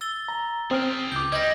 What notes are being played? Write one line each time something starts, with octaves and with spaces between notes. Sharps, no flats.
E6 A6 G7
A#5
C4 G#4 G5 F6
C#2 D6 G6
G3 D#5 G#6 A#6